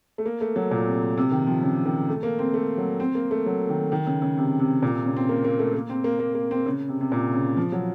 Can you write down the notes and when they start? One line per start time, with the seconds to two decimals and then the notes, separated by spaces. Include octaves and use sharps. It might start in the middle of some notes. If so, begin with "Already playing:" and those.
0.18 A3
0.26 A#3
0.41 A3
0.56 F#3
0.71 A#2
0.86 C3
1.17 C3
1.32 D#3
1.47 F3
1.62 C#3
1.85 D#3
2.09 A3
2.23 A#3
2.39 C4
2.54 A3
2.78 F#3
3.00 C4
3.15 A#3
3.31 A3
3.46 F#3
3.69 D#3
3.92 D#3
4.07 C#3
4.22 C#3
4.37 C3
4.60 C3
4.82 A#2
4.94 C3
5.06 C#3
5.17 C4
5.29 A#3
5.44 A#3
5.59 A3
5.74 A#3
5.90 C4
6.04 A#3
6.19 A#3
6.35 A#3
6.51 C4
6.66 C#3
6.89 C3
7.01 C3
7.12 A#2
7.34 C#3
7.57 F3
7.72 F#3